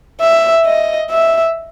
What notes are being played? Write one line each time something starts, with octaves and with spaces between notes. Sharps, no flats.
E5
D#5
E5